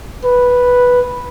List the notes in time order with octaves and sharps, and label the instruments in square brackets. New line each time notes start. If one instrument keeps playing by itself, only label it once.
[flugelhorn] B4